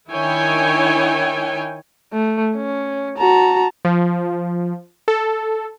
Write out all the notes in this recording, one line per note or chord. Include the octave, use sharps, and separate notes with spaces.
D#3 D4 E4 C#5 G5 G#5
A3
C#4
F#4 A5 A#5
F3
A4